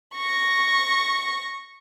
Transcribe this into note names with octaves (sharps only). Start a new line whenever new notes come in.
C#6 A#6